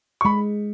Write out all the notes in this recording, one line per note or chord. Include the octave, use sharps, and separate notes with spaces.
C#6
G#3 B5